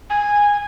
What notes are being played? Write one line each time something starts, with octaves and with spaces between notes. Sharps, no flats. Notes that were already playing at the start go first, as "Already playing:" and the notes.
G#5